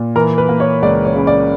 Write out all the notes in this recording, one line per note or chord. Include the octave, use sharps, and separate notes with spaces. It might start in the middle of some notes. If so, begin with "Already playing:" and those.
Already playing: A#2
E3 A#4
B4
A#3
C#5
C#2 D5
C#5
C#3
D5